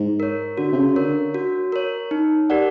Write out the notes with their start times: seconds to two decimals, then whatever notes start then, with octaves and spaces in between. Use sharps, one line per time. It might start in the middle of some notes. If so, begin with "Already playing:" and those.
Already playing: G#2
0.20 A#4 C#5
0.57 D3 F#4
0.72 C3
0.77 C#3
0.96 D3 A#4 C#5
1.34 F#4
1.72 A#4 C#5
2.11 D#4
2.50 G4 A#4 D5 F#5